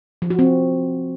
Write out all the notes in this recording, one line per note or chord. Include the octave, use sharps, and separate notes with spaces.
F3
F#4
C4